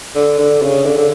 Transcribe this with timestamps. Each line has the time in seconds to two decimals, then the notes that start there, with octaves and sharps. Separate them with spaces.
0.16 D3
0.39 D3
0.63 C#3
0.86 D3
0.98 D3